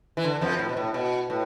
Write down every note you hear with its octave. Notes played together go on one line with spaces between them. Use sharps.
E3
D3
F2 F3
A2
B2
A2
B2
A2